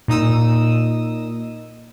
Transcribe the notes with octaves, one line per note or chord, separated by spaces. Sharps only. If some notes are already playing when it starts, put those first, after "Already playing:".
A#2 D#4 D#6 E6